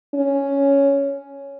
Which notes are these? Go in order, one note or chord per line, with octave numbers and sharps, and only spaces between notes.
C#4